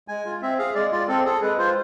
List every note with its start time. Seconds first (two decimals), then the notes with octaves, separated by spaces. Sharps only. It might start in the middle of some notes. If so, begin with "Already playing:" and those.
0.08 G#3 G#5
0.26 F4
0.42 C4 E5
0.59 G#4 F5
0.75 G#3 D5
0.92 F4 D5
1.08 C4 A4
1.25 G#4 A4
1.41 G#3 B4
1.58 F4 C5